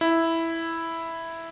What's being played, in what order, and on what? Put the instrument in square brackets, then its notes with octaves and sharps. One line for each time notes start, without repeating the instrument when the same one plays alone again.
[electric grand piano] E4